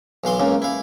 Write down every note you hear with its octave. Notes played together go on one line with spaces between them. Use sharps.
B1 E3 F5 C6
C#2 C#3 A#3
E4 F5